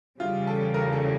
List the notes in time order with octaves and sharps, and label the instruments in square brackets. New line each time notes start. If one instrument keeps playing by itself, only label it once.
[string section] E2 C#3 E3 G3 [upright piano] F4
[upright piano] A4
A#4
A4